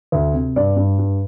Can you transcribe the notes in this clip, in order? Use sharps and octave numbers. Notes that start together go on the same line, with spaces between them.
D2
C3
G2 D5
G2
G2